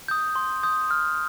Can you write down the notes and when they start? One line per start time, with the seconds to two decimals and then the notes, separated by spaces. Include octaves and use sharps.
0.08 D#6 G6
0.36 C6
0.63 D#6 G6
0.91 F6